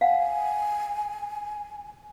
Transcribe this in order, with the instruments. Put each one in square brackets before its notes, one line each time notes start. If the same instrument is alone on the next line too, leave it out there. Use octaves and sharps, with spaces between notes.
[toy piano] F5 F#5 [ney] G#5